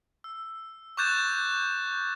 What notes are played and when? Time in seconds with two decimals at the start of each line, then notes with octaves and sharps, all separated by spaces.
0.24 E6
0.97 C#6 D6 F#6 G6 A6 E7